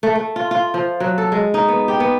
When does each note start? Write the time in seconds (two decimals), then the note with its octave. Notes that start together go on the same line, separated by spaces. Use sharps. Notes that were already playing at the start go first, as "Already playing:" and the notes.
0.03 A3
0.15 A3
0.36 F4
0.51 F4
0.74 F3
1.00 F#3
1.18 A4
1.32 G#3
1.54 D#4
1.68 B3
1.88 G4
2.00 B3